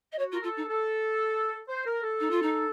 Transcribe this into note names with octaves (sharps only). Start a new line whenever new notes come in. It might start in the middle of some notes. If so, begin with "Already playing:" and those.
D#5
F#4 C#5
F4
A#4
F4 A4
D#4
A4
C5
A#4
A4
D#4
F4
D#4